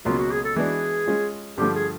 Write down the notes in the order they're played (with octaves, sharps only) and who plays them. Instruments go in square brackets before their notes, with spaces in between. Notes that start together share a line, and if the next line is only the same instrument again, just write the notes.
[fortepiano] C#2 B2 F#3 A#3 [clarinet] F4
[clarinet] F#4
G#4
A4
[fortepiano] E3 G#3 B3 D4 F#4 [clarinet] G#4
[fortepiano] G#3 C#4 F4
[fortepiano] G2 D3 F3 A3 [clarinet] G4
[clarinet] G#4